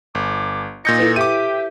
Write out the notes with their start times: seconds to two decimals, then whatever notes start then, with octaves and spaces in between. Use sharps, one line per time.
0.15 G1 D6
0.85 A#2 D#4 G6 A#6 C#7
0.99 E4 A4 B4
1.16 G4 E5 D6 D#7